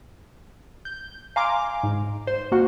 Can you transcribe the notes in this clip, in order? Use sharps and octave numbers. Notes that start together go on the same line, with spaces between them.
G6
F5 G#5 A#5 C6 D6
G#2
C5
A#3 F#4 F#5